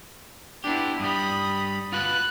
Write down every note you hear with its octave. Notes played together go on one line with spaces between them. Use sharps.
B3 D4 E4 G4
G2 G3 B5 D#6
F4 F#4 B4 F#6